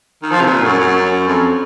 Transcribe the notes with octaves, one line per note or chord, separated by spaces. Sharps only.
D#3
F3
C3
A#2
F#2
F#2
F2